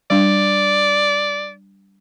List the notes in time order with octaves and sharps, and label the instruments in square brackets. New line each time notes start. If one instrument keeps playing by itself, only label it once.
[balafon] G3 D4 [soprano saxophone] D5